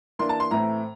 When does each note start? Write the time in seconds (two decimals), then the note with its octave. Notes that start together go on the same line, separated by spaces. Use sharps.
0.19 E3 A#3 D4 C6
0.29 A5
0.40 C6
0.51 A2 E3 A3 C4 A#5